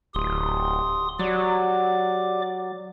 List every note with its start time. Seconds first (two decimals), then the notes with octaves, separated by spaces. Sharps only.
0.15 D1 G4 C6 D#6
1.19 F#3 G4 D5 D6